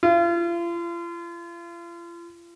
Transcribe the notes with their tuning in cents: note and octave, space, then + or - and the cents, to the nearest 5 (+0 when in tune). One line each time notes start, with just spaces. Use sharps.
F4 -40